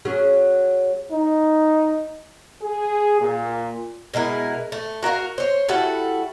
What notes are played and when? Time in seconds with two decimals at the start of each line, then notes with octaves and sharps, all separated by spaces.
0.05 F#3 C#4 G#4
1.11 D#4
2.62 G#4
3.20 A#2
4.14 B2 G#3 E4 A#4
4.72 A3
5.03 F#4 A#4 E5 F5
5.38 C5 C#5
5.69 G3 E4 F#4 A4